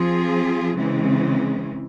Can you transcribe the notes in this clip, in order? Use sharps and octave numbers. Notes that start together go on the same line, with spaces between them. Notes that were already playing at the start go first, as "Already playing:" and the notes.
Already playing: F3 C4 F4 G#4
C#3 E3 G#3 C4